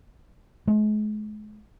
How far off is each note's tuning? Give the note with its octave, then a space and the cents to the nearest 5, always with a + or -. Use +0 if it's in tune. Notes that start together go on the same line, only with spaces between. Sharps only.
G#3 +40